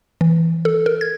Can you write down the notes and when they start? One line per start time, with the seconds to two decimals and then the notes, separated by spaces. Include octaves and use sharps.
0.21 E3
0.65 A4
0.86 A#4
1.01 G#6